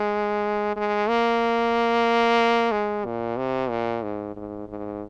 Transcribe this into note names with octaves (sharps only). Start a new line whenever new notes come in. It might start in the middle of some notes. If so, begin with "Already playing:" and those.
Already playing: G#3
G#3
A#3
G#3
A#2
C3
A#2
G#2
G#2
G#2